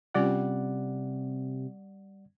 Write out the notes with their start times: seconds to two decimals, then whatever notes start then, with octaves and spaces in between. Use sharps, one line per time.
0.14 C3 G3 C4 C#4 F4 D5 F#5